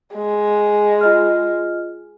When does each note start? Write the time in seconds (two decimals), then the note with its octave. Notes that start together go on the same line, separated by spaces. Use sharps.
0.15 G#3
1.01 F4 D#5 F6